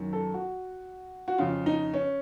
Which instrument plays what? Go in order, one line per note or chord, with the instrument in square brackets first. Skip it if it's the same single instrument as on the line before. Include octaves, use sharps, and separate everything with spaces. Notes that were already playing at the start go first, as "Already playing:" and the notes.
Already playing: [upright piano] F#2 D#3
A4
F#4
F#4
F2 C#3 F4
D#4
C#4